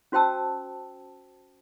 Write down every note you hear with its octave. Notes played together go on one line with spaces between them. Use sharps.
C#4 F#4 C5 G5 A5 E6